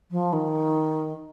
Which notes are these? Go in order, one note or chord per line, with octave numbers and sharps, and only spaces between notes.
F3
D#3